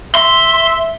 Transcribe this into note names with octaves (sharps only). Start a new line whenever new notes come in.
E5 C6